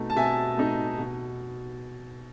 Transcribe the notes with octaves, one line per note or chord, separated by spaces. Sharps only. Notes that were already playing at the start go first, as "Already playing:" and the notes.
Already playing: B2 A3 D#4
A5
B2 E5 G#5
A3 D#4
B2